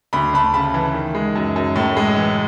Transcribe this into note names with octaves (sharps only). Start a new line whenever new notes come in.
D2 B5
D2 A5 B5
C#3 A5 B5
E3
D#3
G#3
F#2
F#2
A2
G#3
E3